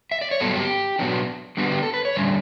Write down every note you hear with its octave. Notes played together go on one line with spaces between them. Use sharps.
E5
D5
C#5
G2 F#3 B3 A4
G4
B2 F#3 B3 D4
D3 G3 B3 D4 F#4
G4
A4
B4
C#5
E2 D3 G3 C#4 D5